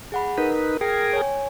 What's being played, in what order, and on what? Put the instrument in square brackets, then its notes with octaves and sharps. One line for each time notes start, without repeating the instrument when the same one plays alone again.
[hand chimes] G#4 F#5 B5
[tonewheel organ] D#4 B4 [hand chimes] A#4
[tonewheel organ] G#4 A#4 [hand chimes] G5
[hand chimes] C#5 G#5